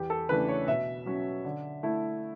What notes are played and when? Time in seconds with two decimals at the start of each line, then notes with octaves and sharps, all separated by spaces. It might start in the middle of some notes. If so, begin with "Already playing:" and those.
Already playing: E2 G4
0.10 A4
0.29 C#3 E3 A3 D4 B4
0.48 C#5
0.68 B2 E5
1.06 F#3 C#4
1.45 D3
1.83 A3 E4